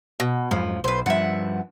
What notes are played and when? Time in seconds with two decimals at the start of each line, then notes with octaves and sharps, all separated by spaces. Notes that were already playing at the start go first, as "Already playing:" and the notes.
0.20 B2
0.51 F2 G#2 F3 F#3
0.84 B1 B4 C5
1.06 G2 F3 E5 F#5